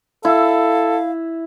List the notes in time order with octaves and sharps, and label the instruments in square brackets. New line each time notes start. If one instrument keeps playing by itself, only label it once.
[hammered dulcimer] E4 [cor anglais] A4 [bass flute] F5